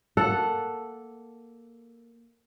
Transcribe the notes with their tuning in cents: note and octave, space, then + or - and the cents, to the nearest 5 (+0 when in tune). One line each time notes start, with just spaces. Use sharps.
A#3 +0 A4 +0 F#5 +0